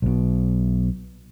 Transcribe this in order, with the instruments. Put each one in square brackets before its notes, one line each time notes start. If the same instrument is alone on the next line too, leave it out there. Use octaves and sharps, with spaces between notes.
[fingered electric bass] B1 B2